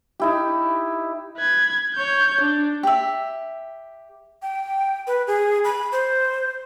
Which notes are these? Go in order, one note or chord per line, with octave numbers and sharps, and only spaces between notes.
D#4 E4 G4
B4 G#6
C#5 G6
D4
G4 E5
G5
B4
G#4
B5
C5